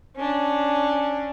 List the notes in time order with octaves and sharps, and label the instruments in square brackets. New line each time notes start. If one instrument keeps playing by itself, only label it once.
[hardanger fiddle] C#4 D4